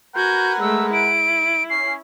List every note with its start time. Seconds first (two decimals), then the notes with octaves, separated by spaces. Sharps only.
0.16 F#4 A#4 B4 F#5 G#5 G6
0.61 G#3 A3 E6
0.93 E4 D7
1.70 C#4 C7